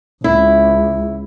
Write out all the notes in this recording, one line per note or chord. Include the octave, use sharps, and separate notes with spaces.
C#2 E4